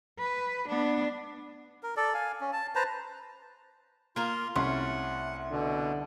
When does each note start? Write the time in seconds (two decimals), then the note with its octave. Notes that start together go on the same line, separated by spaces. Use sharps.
0.19 B4
0.68 B3 D4
1.83 A#4
1.97 A4 D5
2.14 F5 G#5
2.41 C#4
2.53 A5
2.75 B4 C5 A5 A#5
4.16 A#3 F4 A#4 C6
4.56 C2 A3 C#4 F#5 C6
5.51 B2 D3